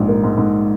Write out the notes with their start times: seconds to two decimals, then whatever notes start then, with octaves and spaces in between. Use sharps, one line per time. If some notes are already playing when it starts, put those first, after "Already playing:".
Already playing: A#1 G#2
0.08 A#3
0.24 G#2
0.38 G#2